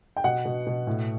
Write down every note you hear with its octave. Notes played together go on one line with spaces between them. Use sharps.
G5
B2 F#5
B2
B2
A2